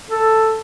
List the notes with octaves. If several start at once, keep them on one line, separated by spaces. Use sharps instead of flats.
A4